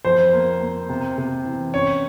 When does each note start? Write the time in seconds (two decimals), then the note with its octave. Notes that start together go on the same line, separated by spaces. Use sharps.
0.05 F2 C5
0.33 A#3
0.61 A#3
0.89 C3
1.18 C3
1.45 E3
1.73 C#4 C#5